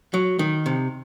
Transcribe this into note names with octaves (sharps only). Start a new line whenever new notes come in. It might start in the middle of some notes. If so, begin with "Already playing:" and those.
F#3
D#3
C3